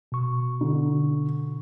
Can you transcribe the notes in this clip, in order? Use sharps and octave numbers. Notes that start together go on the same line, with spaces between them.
B2 C#6
D3